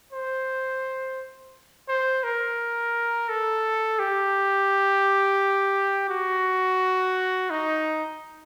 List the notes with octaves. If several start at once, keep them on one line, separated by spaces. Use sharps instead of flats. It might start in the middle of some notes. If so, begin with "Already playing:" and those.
C5
C5
A#4
A4
G4
F#4
D#4